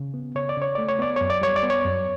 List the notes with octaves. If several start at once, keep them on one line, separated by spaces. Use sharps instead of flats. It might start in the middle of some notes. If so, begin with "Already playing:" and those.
Already playing: C#3
B3
C#3 C#5
D5
C#3
C#5
A3 D5
C#5
B3 D5
F#2 C#5
D5
G3 C#5
D5
B3
C#5
F#2